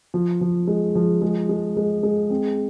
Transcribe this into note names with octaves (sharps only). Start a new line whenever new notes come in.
F3
F3
G#3
F3
G#3
G#3
G#3
G#3
C4